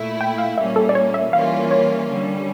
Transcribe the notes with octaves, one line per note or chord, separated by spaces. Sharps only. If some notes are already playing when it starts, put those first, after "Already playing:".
Already playing: A#2 A3 E4
G5
F5
A#2 G3 A#3 C#4 E5
A4
D5
C#5
E5
E3 G3 A#3 C#4 F4 F5
C#5
D3 G3 C#4